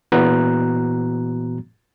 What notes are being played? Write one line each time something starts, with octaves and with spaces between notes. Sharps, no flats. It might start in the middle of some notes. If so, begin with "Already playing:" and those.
A#2 E3 B3 F#4 A#5 F#6